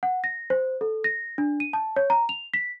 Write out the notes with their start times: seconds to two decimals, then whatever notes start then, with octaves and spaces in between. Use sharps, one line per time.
0.03 F#5
0.24 A#6
0.50 C5
0.81 A4
1.04 A#6
1.38 D4
1.60 D#7
1.73 A5
1.96 C#5
2.10 A#5
2.29 F7
2.54 B6